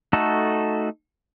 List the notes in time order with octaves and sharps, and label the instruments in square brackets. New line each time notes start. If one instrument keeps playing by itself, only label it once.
[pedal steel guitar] A3 D#4 F#4 A4